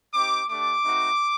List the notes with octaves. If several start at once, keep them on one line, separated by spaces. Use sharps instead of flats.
C4 D#4 G4 D6
A3 D4 G4 D6
A3 C4 D#4 F#4